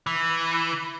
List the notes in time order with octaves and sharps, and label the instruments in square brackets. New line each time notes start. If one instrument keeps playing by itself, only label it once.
[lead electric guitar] E3